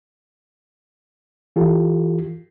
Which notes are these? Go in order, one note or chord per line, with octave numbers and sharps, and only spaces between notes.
E3 F4 G4 A4